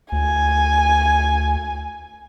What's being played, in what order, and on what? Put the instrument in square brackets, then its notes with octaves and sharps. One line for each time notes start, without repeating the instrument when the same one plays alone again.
[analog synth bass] D2 [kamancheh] G#5